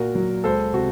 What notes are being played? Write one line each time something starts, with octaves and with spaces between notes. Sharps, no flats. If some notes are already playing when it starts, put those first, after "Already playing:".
Already playing: A#2 F#4 A#4
F#3
C#2 A4 C5
C3 F#4